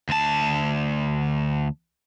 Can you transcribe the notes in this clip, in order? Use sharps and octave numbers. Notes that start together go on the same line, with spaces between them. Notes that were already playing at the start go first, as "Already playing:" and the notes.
D2 A5